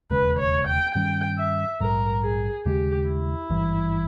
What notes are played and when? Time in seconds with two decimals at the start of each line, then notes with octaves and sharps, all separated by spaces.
0.10 E1 D#2 C#3 G#3 B4
0.39 C#5
0.67 G5
0.95 G2 D#3 G3 C#4 G5
1.39 E5
1.80 A#1 G#2 G3 A#4
2.23 G#4
2.65 D#2 C#3 G#3 G4
3.08 E4
3.50 G#1 G2 E3